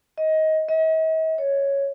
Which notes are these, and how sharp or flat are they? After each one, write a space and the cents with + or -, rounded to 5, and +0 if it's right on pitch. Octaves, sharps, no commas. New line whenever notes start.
D#5 +20
D#5 +45
C#5 +0